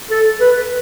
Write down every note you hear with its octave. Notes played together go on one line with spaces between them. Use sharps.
A4
B4